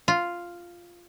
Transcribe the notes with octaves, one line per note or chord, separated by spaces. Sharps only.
F4